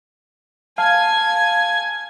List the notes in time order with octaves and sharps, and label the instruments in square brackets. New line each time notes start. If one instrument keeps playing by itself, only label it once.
[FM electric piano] F5 [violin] G#5 G#6 [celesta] A5